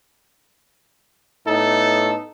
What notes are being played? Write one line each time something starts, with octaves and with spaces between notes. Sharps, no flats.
A2 B3 D#4 A4